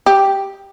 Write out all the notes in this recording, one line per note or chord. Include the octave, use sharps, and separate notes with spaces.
G4